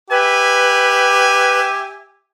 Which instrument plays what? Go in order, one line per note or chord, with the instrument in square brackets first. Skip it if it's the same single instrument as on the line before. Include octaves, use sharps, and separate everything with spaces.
[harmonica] G4 [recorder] B4 [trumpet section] E5 G#5